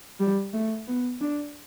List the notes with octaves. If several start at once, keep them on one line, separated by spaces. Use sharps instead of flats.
G3
A3
B3
D4